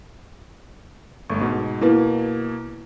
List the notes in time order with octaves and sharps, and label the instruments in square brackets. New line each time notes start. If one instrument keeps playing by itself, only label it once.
[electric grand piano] G1 A3 [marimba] C#6
[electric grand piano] G#2 B2
[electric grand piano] B2 A#3 [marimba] E4 B4